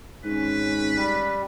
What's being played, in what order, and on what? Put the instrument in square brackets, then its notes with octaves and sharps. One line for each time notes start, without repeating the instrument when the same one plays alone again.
[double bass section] G#1 C#4 [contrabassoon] G#2 [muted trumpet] B4
[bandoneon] G3